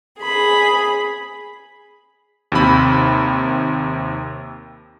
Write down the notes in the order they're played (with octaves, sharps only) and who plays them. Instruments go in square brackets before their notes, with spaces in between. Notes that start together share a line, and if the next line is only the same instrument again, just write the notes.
[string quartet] G#4 B5
[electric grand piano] D#2 C3 B5